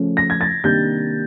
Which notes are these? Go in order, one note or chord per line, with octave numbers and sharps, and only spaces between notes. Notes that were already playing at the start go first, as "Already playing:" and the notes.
Already playing: C#3 F3 A3 C#4 F4
A#6
G#6
A6
C3 D#3 G3 A#3 D4 G6